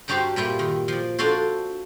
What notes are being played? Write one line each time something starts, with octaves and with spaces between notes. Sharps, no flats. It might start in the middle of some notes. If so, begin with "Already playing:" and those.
G2 G3 D#4 F#4 G4 C5
A#2 G3 E4 F4
D#3
F3 D5
D4 F4 F#4 A4 C5